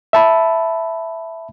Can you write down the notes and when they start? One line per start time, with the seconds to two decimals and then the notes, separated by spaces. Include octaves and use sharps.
0.13 E5 A5 B5